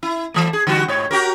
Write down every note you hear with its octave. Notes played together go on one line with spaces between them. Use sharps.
E4
E3 A3
G#4
D3 G3 F#4
G#2 C#5
F#4 G4 A#4